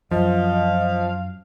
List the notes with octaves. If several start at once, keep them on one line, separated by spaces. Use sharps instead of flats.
F#2 F3 D#5 F5